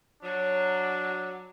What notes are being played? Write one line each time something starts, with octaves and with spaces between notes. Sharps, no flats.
F#3 D4